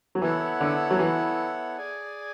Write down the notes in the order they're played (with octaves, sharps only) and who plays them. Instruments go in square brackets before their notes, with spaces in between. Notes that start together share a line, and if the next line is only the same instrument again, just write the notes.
[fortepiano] F#3
[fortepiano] E3 [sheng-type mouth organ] B3 E4 A4 C#5 F#5
[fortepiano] D3
F#3
E3
[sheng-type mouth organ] G#4 D5 G#5